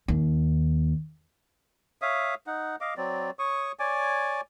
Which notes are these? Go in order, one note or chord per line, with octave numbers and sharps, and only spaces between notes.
D#2
C#5 E5 F5 D#6
D#4 F#5
D#5 F5 D6
F#3 C4 D5
C#5 C#6 D#6
C#5 D5 G#5 D6